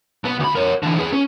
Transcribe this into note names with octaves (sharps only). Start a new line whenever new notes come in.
B1 B3
D2 B5
A#4 C#5
D3 E3
G#4 B4
C#4